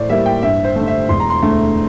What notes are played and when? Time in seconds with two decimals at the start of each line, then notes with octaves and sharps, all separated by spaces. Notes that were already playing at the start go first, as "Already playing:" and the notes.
Already playing: A2 C5 D5
0.09 G3 A#3 E4 E5
0.26 G5
0.43 G2 E5
0.65 C5
0.76 D3 A3
0.88 E5
1.09 E1 C6
1.20 A#5
1.30 C6
1.42 D2 D3 A3